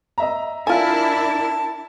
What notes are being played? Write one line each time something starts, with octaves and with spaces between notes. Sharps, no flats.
D#5 E5 A#5
D4 E4 F4 A#4 G#5 A5